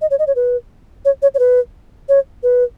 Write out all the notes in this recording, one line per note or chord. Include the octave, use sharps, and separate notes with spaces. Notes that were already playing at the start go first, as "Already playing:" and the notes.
D#5
C#5
D#5
C#5
B4
C#5
C#5
C#5
B4
C#5
B4